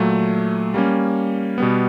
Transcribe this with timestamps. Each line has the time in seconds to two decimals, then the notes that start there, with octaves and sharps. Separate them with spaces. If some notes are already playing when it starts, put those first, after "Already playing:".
Already playing: A#2 F#3 A3
0.74 G3 A#3 C#4
1.58 B2 G3 B3